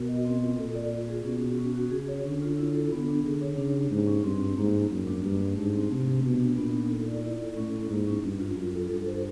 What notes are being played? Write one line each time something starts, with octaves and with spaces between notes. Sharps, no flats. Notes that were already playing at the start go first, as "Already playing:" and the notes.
Already playing: B2 F#4 A#4
D#5
C4
F4
A#2 A4
D5
F4
G#4
B2 C#4
F#4
C#4
F#4
C#3 G#4
C#5
D3 C#4
F4
E4
A4
D3 B3
D4
D3 G#4
C#5
C#3 D4
G4
G#2 A#3
C#4
G2 C4
F4
G#2 A#3
C#4
F#2 A#3
D4
G2 A#3
D4
G#2 A3
C4
C3 A3
D4
B2 B3
D4
A#2 B3
D#4
A4
D5
E4
A4
A2 C#4
E4
G#2 A#3
C#4
G2 C#4
F4
F#2 F4
A4
G2 A4
C5